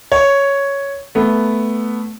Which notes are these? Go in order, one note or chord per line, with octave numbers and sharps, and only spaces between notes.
C#5
A3 B3